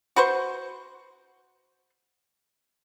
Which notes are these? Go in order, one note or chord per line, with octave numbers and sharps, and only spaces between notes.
F#4 B4 C5 C#6